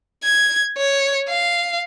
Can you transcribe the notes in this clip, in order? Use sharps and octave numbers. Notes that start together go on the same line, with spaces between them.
G#6
C#5
F5